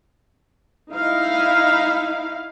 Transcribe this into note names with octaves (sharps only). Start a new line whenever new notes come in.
D#4 E4 F5